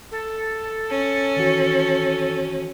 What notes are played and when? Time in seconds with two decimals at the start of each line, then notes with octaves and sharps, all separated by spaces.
0.11 A4
0.90 C#4
1.36 D#3 E3 F#4